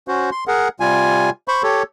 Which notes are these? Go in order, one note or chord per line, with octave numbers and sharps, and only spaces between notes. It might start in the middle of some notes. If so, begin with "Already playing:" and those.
C#4 F#4 C5
C6
G#4 A#4 F#5
C3 G3 F4 G#5
C5 B5 C#6
G4 A4 C#5